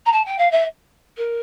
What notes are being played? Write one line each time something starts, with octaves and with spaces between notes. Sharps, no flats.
A#5
A5
G5
F5
E5
A#4